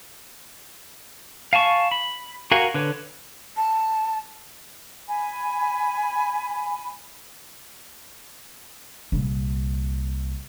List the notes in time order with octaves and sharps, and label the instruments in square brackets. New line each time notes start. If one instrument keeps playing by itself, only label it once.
[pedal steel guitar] F5 G#5 A5 C#6
B5
F#4 A#4 F5 F#5 G#5
D3 B4 C#5
[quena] A5
[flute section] G#5 B5
[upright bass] C2 A#2